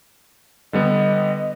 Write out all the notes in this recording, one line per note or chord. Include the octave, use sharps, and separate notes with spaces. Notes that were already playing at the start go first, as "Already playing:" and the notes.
D3 G3 B3 D#5